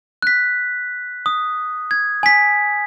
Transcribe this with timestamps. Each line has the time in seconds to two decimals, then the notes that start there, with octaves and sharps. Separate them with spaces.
0.22 F#6 B6
1.26 D#6
1.91 G#6
2.23 G#5 B6